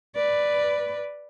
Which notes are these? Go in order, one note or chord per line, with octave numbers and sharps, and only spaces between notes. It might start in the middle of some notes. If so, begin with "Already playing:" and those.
B4 D5